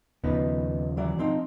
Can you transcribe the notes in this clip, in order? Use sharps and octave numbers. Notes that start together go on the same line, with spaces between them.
D#2 C#3 F3 B3 D#4 B4
E3 F#3 D5
F3 C4 D#4